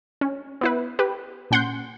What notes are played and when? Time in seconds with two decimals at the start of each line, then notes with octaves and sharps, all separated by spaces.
0.21 C#4
0.61 B3 E4 B4
0.99 G4 B4
1.51 A#2 C#4 F#5 C6 G6